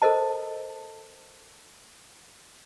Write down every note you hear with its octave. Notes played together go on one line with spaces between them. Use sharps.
A4 A#4 C5 D#5 A5